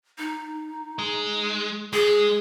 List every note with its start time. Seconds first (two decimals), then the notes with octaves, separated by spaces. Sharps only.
0.18 D#4
0.99 G#3
1.93 G#3 G#4